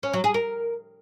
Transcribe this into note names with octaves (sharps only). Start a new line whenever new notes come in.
C#4
F#3
G#4
A#4